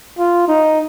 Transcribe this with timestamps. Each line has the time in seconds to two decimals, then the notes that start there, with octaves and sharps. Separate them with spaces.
0.19 F4
0.48 D#4